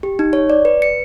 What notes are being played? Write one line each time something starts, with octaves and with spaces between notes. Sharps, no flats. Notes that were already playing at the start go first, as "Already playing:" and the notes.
G4
D#4
C#5
D5
B4
C#7